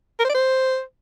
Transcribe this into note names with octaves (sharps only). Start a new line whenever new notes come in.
A#4
C5
D5
C5